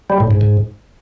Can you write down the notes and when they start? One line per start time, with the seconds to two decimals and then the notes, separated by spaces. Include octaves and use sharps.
0.10 G3
0.20 A2
0.31 G#2
0.41 G#2